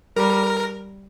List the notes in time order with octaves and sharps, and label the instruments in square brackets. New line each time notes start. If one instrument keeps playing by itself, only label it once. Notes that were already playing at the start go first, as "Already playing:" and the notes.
[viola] G3 [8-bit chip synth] A#4